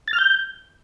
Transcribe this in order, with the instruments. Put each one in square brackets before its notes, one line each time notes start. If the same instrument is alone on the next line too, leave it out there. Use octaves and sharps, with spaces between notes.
[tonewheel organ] A6
F6
G6